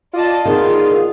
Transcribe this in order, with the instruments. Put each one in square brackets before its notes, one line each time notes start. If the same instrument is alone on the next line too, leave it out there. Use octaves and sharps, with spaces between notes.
[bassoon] F4 [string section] D5 D#5 A5
[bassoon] A#2 [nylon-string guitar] D#3 B3 D#4 [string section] F4 [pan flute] G#4